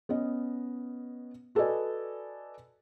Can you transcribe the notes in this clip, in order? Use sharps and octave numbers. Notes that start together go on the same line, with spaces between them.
B3 C#4 D#5
F#4 A4 B4 D5 D#5 G#5